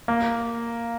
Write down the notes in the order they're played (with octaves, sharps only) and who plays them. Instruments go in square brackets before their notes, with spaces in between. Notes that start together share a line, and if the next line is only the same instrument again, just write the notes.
[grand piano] A#3